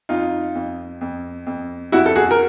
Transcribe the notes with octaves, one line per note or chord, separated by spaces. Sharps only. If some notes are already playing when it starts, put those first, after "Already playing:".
F2 D#4 F4
F2
F2
F2
F2 E4 F#4
A4
F#4 G#4
A#4